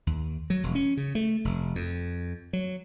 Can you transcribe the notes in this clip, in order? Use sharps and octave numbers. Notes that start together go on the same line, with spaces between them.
D#2
F#3
E1
C#4
C#3
A3
F1
F2
F#3